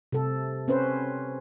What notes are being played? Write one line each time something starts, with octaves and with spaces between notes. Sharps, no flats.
C3 A4
C4 C#4 B4 C5